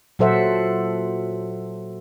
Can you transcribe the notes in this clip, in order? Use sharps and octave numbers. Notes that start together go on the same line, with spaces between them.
A#2 F#3 A4 C5 E5 F#5